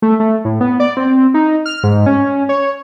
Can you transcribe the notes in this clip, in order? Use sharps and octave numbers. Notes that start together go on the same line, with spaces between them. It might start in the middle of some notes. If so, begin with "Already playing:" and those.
A3
A3
A2
B3
D5
C4
D#4
F6
G#2
C#4
C#5